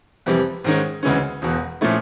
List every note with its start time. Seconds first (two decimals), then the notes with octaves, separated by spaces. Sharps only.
0.26 F2 C3 E3 G3
0.64 G#2 D#3 G#3 C#4
1.03 D2 C#3 E3 G#3 C#4
1.42 E1 E2 B2
1.81 A#2 F3 A3 C#4 E4